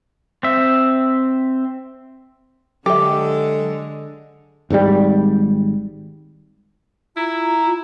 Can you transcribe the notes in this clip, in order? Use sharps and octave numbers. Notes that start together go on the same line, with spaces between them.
C4 E5
D3 F#3 G#3 G4 A4 E5
G#1 G#2 C#3 G3
E4 F4 A#5